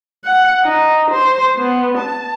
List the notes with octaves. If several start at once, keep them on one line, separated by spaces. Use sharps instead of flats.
F#5
D#4
C5
B3
A5